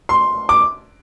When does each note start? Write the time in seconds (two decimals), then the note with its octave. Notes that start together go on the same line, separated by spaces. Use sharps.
0.09 C6
0.49 D6